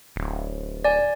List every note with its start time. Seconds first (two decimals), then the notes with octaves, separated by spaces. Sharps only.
0.16 D1
0.85 D5 G#5